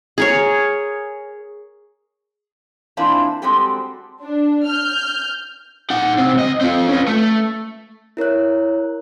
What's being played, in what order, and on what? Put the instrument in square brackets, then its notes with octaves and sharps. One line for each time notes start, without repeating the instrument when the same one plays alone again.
[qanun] G#4 A#4 C#5
[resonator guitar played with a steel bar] E3 A#3 C4 D4 E4 F4
G3 G#3 C4 F#4 G4 A4
[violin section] D4
F6 G6
[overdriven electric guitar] D#4 F#5
C3 C4
C#2 D#5
C4 F4
C#4 B4
A3
[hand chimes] E4 A#4 C#5 F#6